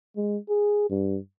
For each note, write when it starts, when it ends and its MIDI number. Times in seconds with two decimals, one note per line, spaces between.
0.16 0.37 56
0.49 0.89 68
0.90 1.18 43